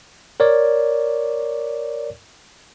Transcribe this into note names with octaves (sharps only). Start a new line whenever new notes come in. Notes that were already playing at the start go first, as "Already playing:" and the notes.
A#4 C#5 D5